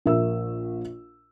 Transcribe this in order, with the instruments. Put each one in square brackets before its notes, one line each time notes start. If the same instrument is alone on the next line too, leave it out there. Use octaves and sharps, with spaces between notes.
[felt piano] A#1 A#4 E5 E6